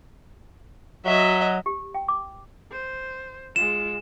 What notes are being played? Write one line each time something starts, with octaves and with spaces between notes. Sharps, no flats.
F#3 D#5 E5
G4
G5
D6
C5
G#3 F4 E7